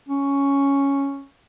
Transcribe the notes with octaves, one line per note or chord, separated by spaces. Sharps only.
C#4